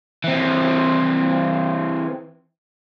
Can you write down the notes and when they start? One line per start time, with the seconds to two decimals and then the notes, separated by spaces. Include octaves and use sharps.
0.24 E3 C4